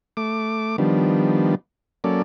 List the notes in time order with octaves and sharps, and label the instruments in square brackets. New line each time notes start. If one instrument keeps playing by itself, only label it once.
[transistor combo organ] A3 D6
D#3 F3 G3 B3 D4
F#3 A#3 C#4 A4 D5